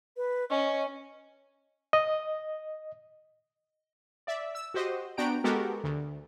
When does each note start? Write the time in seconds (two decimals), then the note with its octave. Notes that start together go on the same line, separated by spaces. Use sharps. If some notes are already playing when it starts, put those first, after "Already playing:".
0.17 B4
0.50 C#4 D#5
1.93 D#5
4.27 D5 E5
4.55 E6
4.74 F#4 G4 C5 D#5
5.17 B3 D4 F#4 G5 A#5 D7
5.44 G#3 B3 F#4 G4 A4 A#4
5.84 D2